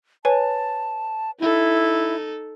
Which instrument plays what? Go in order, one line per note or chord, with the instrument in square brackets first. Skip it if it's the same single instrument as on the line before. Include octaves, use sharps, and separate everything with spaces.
[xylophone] B4 C#5 G#5 [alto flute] A5
[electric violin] D#4 A4 [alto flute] E4